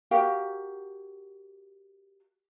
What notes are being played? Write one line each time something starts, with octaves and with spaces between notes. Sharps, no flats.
F#4 G4 A#4 F5